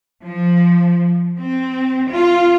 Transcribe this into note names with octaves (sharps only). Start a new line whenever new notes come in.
F3
C4
F4